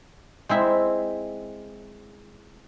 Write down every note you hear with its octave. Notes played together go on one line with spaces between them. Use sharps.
G#3 C4 E4 E5